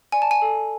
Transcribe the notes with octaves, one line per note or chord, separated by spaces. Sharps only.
D5 G#5
A5
G#5
A4